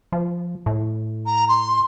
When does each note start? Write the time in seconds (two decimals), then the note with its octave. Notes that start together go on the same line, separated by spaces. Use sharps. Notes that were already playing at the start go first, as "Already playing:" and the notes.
0.12 F3
0.66 A2
1.26 A#5
1.48 C6